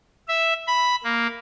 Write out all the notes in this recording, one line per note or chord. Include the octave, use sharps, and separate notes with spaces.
E5
B5
A#3